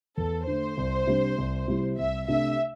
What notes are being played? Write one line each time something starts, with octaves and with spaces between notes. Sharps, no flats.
E2 A4
D3 A3 C5
C2
C3 G3 D4
C2
C3 G3 E4
C2 E5
C3 A3 D4 E5